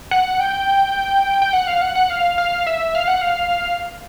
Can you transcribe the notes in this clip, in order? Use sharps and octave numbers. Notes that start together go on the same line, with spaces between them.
F#5
G5
G5
F#5
F5
F#5
F#5
F5
F5
E5
F5
F#5
F5